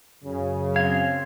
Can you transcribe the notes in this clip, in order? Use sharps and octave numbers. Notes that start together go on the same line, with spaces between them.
F#2 C#3
C4 F5 G#6